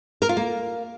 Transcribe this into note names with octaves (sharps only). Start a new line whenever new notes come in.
A#4
F4
A#3